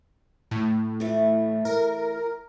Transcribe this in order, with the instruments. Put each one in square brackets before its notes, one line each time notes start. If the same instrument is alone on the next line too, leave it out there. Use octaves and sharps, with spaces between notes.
[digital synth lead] A2
[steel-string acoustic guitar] E3 A3
[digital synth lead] A#4